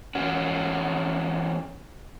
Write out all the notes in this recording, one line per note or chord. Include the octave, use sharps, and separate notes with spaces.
E2 C#4 F#4